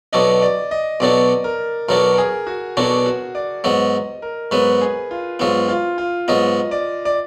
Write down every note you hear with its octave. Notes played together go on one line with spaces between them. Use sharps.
B1 B2 F#3 D4 D#5
D5
D#5
B1 B2 F#3 D4 D5
A#4
B1 B2 F#3 D4 A#4
A#4
G#4
F#4
B1 B2 F#3 D4 F#4
F#4
D5
G#2 F#3 B3 D#5
A#4
G#2 F#3 B3 B4
G#4
F4
G#2 F#3 B3 F4
F4
F4
G#2 F#3 B3 D#5
D5
D5